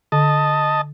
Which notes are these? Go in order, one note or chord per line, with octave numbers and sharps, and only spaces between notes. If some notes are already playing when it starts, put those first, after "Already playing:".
D3 D#5 A5